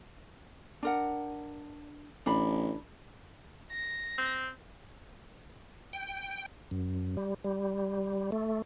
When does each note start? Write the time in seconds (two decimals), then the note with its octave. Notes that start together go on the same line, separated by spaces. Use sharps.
0.83 D4 A#4 F#5
2.26 A1 D4 B5
3.71 A#6
4.18 C4
5.93 G5
6.71 F#2
7.17 G3
7.44 G3
8.32 A3